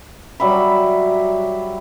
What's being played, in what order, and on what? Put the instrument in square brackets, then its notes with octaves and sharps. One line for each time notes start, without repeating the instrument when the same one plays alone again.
[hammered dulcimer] F#3 G3 E5 B5